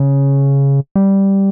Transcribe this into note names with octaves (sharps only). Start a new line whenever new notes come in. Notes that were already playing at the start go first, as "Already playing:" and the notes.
Already playing: C#3
G3